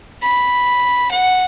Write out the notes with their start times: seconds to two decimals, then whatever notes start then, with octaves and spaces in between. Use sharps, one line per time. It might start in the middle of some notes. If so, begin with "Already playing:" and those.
0.22 B5
1.11 F#5